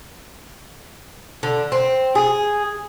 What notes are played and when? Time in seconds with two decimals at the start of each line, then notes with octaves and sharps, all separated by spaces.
1.43 D3
1.72 C4
2.15 G#4